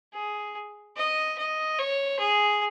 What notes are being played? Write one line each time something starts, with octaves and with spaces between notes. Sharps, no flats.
G#4
D#5
D#5
C#5
G#4